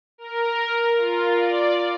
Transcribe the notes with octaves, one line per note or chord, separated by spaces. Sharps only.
A#4
F4
D5